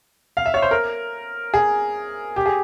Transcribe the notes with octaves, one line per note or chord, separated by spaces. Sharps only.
F5
E5
C#5
C5
A#4
G#4
G4
G#4